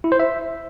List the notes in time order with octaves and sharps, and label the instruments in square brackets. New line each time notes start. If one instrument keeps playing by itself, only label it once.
[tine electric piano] E4
C5
E5